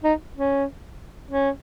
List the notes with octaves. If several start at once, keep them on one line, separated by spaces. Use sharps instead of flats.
D#4
C#4
C#4